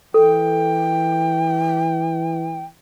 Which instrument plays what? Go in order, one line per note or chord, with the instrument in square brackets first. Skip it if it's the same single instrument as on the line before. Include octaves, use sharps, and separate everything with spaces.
[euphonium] E3 [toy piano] A4 [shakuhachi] G5